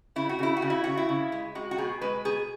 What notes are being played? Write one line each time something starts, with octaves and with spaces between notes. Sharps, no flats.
C#3 E4
F#4
C#3 E4
F#4
C#3
E4
C#3 F#4
E4
C#3
G#3
G#3 F#4
F#4
B2 G#4
G#3 B4
B2 G#4